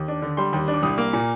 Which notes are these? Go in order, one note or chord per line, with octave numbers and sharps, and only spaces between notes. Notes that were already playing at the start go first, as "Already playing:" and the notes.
Already playing: D#2
D4
D3
G3 C6
D#2
D4
D6
C2 D#6
A#3
A#2